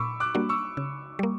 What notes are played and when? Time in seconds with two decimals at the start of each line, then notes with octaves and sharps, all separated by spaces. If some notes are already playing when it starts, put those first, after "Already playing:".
Already playing: A#2 B5 C#6 D6 E6
0.20 D6 F#6
0.35 G3 A#3 D4 F#4
0.49 C#6 E6
0.77 C#3
1.19 G3 A#3